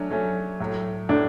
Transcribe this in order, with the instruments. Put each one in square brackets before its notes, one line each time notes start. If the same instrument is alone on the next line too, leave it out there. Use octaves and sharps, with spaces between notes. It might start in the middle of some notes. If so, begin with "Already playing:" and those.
Already playing: [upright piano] F#3 A3 C#4 [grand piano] D4
[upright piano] F#3 A3 C#4
A2 F#3 A3
[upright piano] A2 F#3 A3 [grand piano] D4